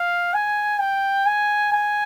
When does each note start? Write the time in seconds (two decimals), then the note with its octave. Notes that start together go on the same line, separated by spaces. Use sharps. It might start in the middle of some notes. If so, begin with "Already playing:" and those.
Already playing: F5
0.34 G#5
0.79 G5
1.26 G#5
1.73 G#5